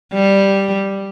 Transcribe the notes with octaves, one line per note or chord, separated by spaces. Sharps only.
G3